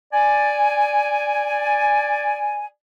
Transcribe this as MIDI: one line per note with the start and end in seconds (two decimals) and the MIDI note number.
0.13 2.65 74
0.13 2.65 80